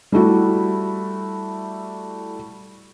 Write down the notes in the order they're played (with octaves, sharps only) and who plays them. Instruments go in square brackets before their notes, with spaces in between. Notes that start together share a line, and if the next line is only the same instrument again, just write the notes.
[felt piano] G3 A3 E4 F#4